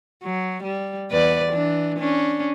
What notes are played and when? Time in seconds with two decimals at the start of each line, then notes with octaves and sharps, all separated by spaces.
0.23 F#3
0.63 G3
1.11 E2 B4 D5
1.52 E3 D4
1.98 C#4 D4